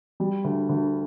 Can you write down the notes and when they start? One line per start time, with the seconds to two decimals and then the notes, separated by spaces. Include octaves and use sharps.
0.20 G3
0.44 D2
0.69 D2